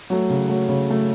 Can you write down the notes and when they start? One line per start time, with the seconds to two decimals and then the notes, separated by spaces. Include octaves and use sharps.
0.10 F#3 A3
0.30 C#3
0.49 F#3 A3
0.69 C#3
0.89 F#3 A3